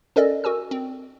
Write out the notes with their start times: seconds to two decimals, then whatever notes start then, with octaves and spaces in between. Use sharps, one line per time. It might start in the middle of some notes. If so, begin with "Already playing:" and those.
0.16 C#4 A4 A#4 D5 D#5
0.44 F#4 A#4 G#5 E6
0.71 C4